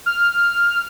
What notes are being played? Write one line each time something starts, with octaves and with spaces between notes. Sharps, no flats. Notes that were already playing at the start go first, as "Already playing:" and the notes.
F6